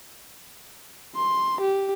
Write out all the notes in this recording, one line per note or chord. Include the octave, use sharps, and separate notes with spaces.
C6
G4